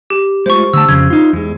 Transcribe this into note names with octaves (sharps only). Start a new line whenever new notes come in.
G4
G#3 A3 F4 C5 C#6
D3 A3 A5 E6
F2 C#3 G#6
D#4 F4
E2 G#3